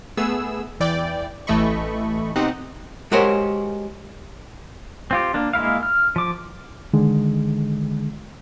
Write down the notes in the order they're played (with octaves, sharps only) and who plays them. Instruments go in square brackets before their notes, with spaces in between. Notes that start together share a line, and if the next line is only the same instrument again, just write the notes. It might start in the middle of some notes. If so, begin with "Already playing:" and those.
[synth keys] A3 B3 G#4 E6
E2 E3 D5 G5
A1 E3 A3 D#5 B5 C#6
B2 C4 D#4 G4 F#5
[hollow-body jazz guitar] G#3 F#4 G4 A#4 C5 C#5
[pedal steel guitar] C4 F4 G4
A#3 D4
G#3 A#3 E4 F5
F6
F3 D6
[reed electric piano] D3 D#3 G#3